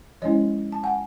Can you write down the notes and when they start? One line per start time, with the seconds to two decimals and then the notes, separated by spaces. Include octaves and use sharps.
0.22 F3 G#3 C#4 E4 C#5 D#5
0.72 A5
0.83 F#5 G#5